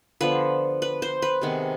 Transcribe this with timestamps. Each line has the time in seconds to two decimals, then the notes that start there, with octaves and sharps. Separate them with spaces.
0.21 D3 F3 B3 B4
0.82 B4
1.02 C5
1.22 B4
1.42 C3 D#3 G#3 B3